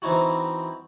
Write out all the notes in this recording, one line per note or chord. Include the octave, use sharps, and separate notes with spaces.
E3 C4 D#4 E4 F#4